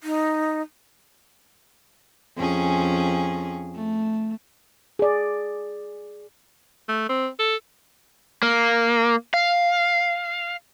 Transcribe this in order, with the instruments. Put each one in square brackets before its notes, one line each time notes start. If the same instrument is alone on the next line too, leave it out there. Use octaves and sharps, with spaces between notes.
[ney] D#4
[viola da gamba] F2 C#4 G#4
A3
[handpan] G#4 D5
[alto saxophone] A3
C4
A4
[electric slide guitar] A#3
F5